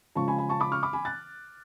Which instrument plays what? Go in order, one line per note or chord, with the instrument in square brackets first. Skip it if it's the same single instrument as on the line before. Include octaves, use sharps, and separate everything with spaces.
[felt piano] C#3 F3 G#3 A5 C#6
G#5 B5
G#5 B5
A5 C#6
B5 D6
C#6 F6
B5 D6
G#5 B5
F#6 A6